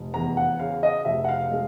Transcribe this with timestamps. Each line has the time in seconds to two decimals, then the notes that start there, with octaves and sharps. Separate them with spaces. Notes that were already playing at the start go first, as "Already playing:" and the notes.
Already playing: F1
0.14 E2 A#5
0.37 F#5
0.59 C#3 F5
0.83 D#5
1.05 F1 E5
1.24 F#5
1.29 F5
1.51 G#3